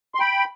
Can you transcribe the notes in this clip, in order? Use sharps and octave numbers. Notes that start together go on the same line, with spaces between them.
C6
G5 B5